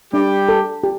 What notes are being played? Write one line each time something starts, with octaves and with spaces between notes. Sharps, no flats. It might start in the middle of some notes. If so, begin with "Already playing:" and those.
G3 D4 G4
A4
G4